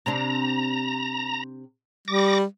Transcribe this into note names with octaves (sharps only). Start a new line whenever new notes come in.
C3 C4 D4 A#5
G3 D6 A#6